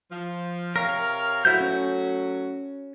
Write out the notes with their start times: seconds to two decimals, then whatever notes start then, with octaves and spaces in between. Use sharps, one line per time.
0.11 F3
0.76 C3 A#4 C#5 F5
0.89 A#4
1.45 F#3 A3 E4 F#4 C5 G6
1.60 C#4